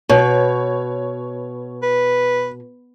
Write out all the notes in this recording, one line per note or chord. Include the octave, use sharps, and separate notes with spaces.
B2 C#5
B4